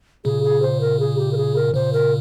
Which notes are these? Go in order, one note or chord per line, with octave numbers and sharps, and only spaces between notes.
A#2 C#3 G#4
G#4
C5
A#4
G#4
G4
A#4
G#4
A#4
A#2 C#3 C5
A#4